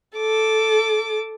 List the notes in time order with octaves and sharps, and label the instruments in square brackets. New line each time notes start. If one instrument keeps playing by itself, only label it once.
[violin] A4 D6